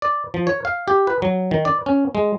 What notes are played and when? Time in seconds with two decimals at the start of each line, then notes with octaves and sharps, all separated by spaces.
0.02 D5
0.34 F3
0.47 C#5
0.65 F5
0.88 G4
1.07 B4
1.22 F#3
1.51 D#3
1.65 D5
1.86 C#4
2.15 G#3